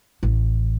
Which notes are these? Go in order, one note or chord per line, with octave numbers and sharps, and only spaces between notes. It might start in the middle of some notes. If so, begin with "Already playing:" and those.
A1